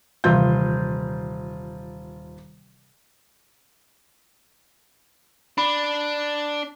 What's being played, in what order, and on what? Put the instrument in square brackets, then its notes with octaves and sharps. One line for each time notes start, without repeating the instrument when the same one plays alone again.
[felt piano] D#1 F4 G6 [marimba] C3 E3 F5
[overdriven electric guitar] D4 [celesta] B5